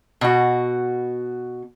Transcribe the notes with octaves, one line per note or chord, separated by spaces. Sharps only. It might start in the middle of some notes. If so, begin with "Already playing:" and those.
B2 F#4